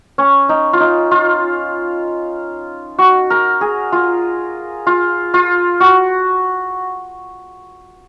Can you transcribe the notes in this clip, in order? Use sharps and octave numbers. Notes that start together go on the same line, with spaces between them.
C#4
D#4
F4
D#4
F4
F#4
A#4
G#4
F4
F4
F4
F#4